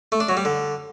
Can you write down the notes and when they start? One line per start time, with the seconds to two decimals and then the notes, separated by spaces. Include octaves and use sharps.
0.12 A3
0.20 D4
0.29 F#3
0.37 G3
0.45 D3